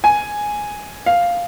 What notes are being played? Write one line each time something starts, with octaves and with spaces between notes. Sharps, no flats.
G#5
F5